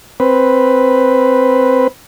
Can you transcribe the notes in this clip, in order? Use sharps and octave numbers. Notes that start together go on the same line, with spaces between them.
C4 B4